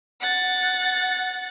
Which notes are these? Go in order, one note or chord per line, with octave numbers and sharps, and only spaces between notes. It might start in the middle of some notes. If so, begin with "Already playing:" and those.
F#5 A6